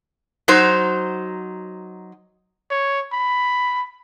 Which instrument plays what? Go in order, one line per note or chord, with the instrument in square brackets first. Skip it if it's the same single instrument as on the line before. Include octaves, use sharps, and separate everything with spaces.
[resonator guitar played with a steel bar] F#3 D#4 C5
[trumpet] C#5
B5